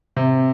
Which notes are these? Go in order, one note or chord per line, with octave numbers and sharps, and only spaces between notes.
C3